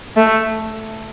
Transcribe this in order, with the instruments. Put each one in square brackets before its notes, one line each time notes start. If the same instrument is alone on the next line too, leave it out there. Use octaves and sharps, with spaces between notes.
[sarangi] A3